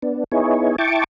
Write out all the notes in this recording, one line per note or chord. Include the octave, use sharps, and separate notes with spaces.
B3 D4
B3 D#4 E4 G#4 C#5
E4 G5 A5 C#6 D6